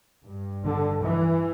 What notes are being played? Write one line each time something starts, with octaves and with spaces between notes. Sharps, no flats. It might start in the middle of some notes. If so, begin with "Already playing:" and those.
G2
D3
E3